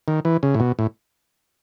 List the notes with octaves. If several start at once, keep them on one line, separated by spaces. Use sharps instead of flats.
D#3
E3
C#3
A2
B2
A2